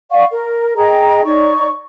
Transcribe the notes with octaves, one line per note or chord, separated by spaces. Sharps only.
D5 F5 F#5 C#6
A#4
G#4 D#5 G5 A#5
D#4 C#5 D5 C#6